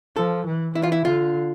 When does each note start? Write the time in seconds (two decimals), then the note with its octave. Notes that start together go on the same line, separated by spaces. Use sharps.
0.16 F3 A4
0.46 E3
0.75 E3 E4
0.83 F4
0.92 E4
1.05 D3 F4